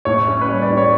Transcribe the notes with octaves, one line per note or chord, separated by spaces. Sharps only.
A2 C#5
C#4
B4
G3 C#5
D5
A2
C#5